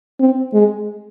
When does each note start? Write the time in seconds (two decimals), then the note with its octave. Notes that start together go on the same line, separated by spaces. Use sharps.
0.20 C4
0.54 G#3